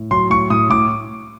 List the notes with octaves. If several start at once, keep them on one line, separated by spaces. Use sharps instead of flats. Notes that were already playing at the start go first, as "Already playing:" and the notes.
Already playing: A2
F#3 C6
A2 C#6
A2 D#6
A2 D6